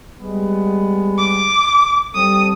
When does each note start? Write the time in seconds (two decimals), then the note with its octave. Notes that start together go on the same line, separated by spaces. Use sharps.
0.20 G3 G#3 B3
1.18 D6
2.14 G3 C4 A4 D#6